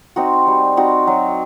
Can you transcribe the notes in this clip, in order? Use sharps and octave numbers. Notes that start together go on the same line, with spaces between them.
C4 D#4 F#4
G3
C4 D#4 F#4
F#3